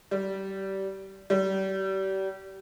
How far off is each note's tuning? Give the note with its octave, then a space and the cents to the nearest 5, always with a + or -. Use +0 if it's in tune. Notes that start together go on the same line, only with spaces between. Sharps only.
G3 -25
G3 -35